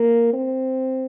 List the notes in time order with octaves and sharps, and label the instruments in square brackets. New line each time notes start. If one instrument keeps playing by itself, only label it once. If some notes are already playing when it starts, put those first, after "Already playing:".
Already playing: [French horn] A#3
C4